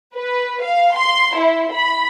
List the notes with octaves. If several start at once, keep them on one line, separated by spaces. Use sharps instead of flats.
B4
F5
C6
E4
B5